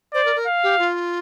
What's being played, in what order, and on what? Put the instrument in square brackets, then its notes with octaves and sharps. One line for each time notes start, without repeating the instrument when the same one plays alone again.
[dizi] C5 [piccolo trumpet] D5
[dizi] A#4
A#4
[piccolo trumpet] F5
[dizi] G4
F4